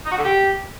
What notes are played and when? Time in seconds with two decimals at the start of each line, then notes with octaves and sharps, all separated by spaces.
0.05 D#4
0.12 F#4
0.18 D3
0.25 G4